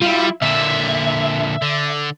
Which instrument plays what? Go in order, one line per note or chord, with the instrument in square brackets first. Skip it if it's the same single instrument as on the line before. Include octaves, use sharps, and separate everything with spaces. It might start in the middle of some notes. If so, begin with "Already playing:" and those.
[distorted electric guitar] G3 [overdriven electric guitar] E4 F4
[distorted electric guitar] A#2 D3 [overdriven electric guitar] E5
[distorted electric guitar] D3